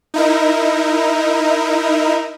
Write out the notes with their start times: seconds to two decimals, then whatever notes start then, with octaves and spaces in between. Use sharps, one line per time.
0.14 D#4 E4 A#4